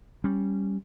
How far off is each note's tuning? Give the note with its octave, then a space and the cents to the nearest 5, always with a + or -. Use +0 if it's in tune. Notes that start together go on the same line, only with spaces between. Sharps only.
G3 +0 C#4 +0